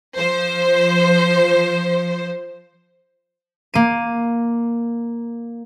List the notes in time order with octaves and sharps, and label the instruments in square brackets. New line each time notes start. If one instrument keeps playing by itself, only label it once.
[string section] F3 C5
[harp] A#3 D#7